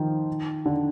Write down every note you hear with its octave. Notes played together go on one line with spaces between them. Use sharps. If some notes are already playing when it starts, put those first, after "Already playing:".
Already playing: D#3 F3
D3